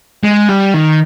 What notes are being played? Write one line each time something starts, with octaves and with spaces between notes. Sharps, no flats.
G#3
G3
D#3